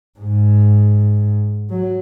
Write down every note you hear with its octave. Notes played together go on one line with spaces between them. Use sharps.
G#2
F#3